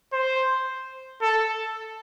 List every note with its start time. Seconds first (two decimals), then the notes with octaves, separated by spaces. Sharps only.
0.13 C5
1.22 A4